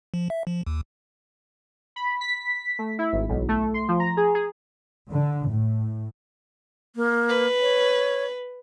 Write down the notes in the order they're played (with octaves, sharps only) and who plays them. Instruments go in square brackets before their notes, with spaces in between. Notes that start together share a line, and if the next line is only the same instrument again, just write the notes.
[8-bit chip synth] F3
E5
F3
D#2
[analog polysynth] B5
B6
A3
E4
G#1
B1
A3
C6
F3
A#5
G#4
G#4
[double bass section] D3
A2
[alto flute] A#3
[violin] B4
[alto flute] C#5